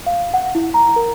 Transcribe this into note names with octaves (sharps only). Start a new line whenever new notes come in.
F5
F#5
E4
A#5
A#4